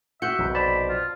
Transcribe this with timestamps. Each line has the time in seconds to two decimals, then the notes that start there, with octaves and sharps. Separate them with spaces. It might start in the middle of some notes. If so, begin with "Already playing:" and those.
0.22 F#4 E5 F#6 G6 C#7
0.38 B1 C3
0.55 C5 D5 A5 B5
0.89 F4